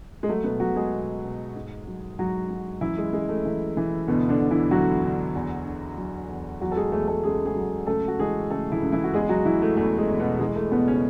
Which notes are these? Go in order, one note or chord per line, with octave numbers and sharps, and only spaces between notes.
G#3
F#3 A3
B2 B3
B2 F#3 F#4
G#3 G#4
B2
B2
G#2
F#3
G#2 F#3 F#4
F#3
F#2 E3 E4
G#3
F#2 G#3
A3
E3
E3
D2 B2 B3
D3 D4
D2
E3 E4
D2 F#3 F#4
D2
E2
D3
F#3
E2
E2 F#3 F#4
A4
G#3 G#4
E2 A3 A4
A3 A4
C#3 G#3 G#4
G#3 G#4
F#3
C#2 A3 A4
F#4
E3 G#3 G#4
C#3 A3 A4
E3 E4
C#2
E3 E4
F#4
E2 G#3 G#4
F#3 F#4
E3 E4
A3
E2 A3
G#3
E2
B2 B3
E3 G#3
A3
E2 B2 B3
C#3 C#4